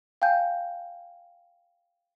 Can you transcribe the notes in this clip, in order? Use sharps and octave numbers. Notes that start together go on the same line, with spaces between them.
F5 G5 G#5 G6